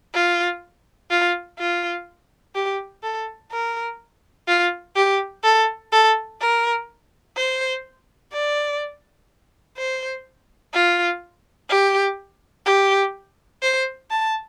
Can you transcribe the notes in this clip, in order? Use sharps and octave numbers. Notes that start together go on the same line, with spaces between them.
F4
F4
F4
G4
A4
A#4
F4
G4
A4
A4
A#4
C5
D5
C5
F4
G4
G4
C5
A5